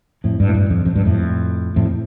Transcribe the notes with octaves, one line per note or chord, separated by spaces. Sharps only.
F2 A2
G2
A2
G2
F2
F2
G2
F2 A2
F2 A2